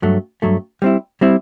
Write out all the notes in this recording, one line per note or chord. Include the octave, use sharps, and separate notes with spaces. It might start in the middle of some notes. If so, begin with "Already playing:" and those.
G2 F#3 A3
G2 F#3 A3
G3 C4 E4
G3 C4 E4